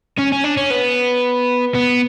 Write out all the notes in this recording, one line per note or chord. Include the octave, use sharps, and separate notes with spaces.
C#4
C#4
D4
C#4
B3
B3